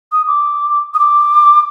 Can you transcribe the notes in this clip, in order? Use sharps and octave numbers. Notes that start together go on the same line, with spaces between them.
D#6
D6
D#6
D6